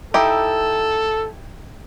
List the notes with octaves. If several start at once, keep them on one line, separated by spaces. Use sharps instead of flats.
D#4 E4 G4 A4